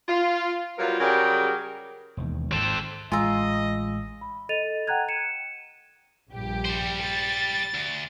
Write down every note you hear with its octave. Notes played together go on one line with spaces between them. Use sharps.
F4
F#3 G3 B3 F4 A#4
C#3 F#3 G3 G4 G#4 A#4
E1 D#2
G#1 C4 A4
A1 G#3 F4 D#5 G#5 A#5 E6
B5
A4 D#5 A6 D#7 F7
F#5 G5 A#5 F#6 G#6
C#7 D#7 E7
A#1 G2 G4
G3 C5
A6
D2